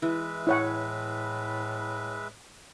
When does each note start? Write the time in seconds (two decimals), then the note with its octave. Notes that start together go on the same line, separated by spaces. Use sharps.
0.02 E3 G#3 B4 E5
0.47 A2 E4 C#5 F#5